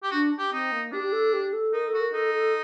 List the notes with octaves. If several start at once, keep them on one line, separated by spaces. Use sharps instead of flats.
G4
D4 F#4
G4
C4 D#4
A#3
D4 G4
G4
A4
G4
A4
D#4 A#4
A4
F#4
A#4
D#4 A4
A4